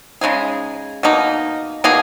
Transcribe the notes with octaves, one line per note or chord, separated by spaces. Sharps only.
C#3 G#3 D#4 G#4
B2 A#3 D#4
B2 A#3 D#4 G#4